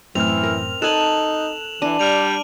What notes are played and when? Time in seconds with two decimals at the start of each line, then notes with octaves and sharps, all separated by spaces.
0.15 F#2 A2 E3 C4 F6 F7
0.43 A#4
0.82 D#4 A4 G#5 A5 F#6 E7 F#7
1.82 E3 D4 D#7
1.99 G3 F6 D7 F7